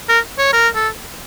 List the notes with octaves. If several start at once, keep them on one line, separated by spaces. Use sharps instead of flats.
A#4
C#5
A#4
A4